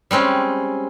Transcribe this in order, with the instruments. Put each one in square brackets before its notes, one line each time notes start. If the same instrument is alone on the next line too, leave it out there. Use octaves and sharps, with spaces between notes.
[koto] G3 G#3 C4 C#4